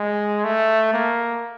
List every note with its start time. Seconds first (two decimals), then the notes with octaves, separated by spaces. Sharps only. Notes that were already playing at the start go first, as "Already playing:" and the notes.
Already playing: G#3
0.44 A3
0.93 A#3